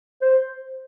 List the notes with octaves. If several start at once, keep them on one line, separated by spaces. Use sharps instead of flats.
C5